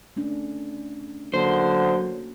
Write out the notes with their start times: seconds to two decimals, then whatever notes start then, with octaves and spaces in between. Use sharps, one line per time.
0.16 A3 C#4 D4
1.34 D3 F#3 A#3 C5